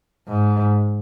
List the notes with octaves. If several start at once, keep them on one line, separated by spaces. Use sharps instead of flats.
G#2